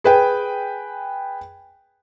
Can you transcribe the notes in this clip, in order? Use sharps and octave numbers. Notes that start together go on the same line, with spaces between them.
G#4 B4 G5